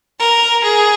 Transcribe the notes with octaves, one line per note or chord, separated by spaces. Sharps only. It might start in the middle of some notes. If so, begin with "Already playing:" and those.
A#4
G#4